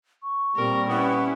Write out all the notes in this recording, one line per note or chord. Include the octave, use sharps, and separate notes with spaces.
C#6
A#2 G3 C4 A#4
B3 C#4 E4